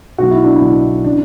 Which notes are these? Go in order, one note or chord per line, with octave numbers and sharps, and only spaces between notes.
B1 B2 F#4
E4
D4
E4
B1 B2
C#3 E3 D4